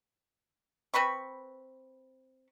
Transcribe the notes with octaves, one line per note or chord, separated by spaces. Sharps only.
C4 B4 B5 C#6